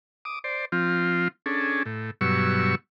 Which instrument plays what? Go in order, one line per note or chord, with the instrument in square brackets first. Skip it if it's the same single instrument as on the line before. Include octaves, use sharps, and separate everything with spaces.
[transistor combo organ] D6 D#6
C5 D5
F3 C4 F4
C#4 D4 G#4 A4
A2
G2 B2 F#3 C#6 E6